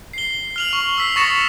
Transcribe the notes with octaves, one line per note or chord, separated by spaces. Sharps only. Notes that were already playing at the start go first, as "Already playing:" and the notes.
C7 G7
F6 F7 F#7
C#6
E6 B6 C7
C#6 D#6 A6 A#6 C#7 E7